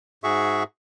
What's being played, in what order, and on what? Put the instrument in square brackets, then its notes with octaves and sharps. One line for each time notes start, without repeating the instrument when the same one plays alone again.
[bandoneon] G#2 F#4 G#4 E5 C#6